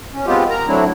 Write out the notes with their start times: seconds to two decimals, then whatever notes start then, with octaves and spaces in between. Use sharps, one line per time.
0.14 C#4
0.26 G#3 B3 C4 F4 G4
0.50 A#4 A#5
0.67 F#3 A3 C4 D4 E4